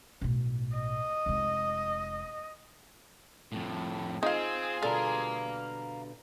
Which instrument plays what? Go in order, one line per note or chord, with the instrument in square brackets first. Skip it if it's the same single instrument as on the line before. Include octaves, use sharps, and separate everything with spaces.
[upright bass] B1 A2
[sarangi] D#5
[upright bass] F1 G#3
[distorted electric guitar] F2 A2
[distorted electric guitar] C4 [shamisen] D#4 F5 [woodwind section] F4 G#4
[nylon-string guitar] B2 D3 G3 [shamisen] A4 [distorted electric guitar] F5 A#5